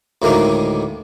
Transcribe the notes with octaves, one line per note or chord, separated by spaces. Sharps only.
D2 A2 D#3 G#3 A#3 D#4